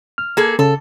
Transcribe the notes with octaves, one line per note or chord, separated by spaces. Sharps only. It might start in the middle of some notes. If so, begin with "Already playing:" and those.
F6
A#3 G#4 A4
C#3 A4 A5